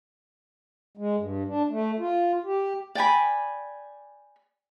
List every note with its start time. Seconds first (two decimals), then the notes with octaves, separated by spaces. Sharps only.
0.97 G#3
1.17 G2
1.48 D4
1.70 A3
1.99 F4
2.45 G4
2.95 D5 G5 G#5 B5